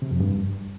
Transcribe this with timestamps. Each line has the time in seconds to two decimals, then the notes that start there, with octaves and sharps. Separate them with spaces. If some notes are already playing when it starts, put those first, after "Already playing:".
0.02 C3
0.11 F2
0.20 G2